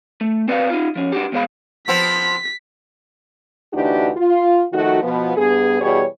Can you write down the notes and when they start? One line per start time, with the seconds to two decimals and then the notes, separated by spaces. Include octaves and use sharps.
0.21 A3
0.48 C4 B4 D5 D#5 F5
0.70 D#4 F4
0.96 F3 C#4
1.12 D4 F#4 G4
1.32 E2 B2 G#3 C5 F5 B5
1.88 F3 B3 C4 B6
3.74 D2 E3 D4 D#4 F#4 G4
4.17 F4
4.73 D#3 F3 A3 D#4 F#4
5.03 B2 F3 B3
5.37 G2 B3 G#4
5.81 B2 E3 G3 G#4 C#5